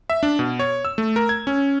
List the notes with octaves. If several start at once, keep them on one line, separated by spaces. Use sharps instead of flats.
E5
D4
B2
C#5
E6
A3
A#4
G#6
C#4